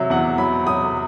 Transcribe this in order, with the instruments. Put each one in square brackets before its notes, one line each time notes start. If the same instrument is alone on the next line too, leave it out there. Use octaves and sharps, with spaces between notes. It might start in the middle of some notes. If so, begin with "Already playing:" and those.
Already playing: [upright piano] C3 F#3 E5
E2 F#5
F#3 B5
F#3 D#6